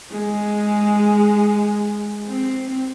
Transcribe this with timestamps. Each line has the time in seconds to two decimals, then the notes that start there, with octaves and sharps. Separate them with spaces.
0.11 G#3
2.27 C4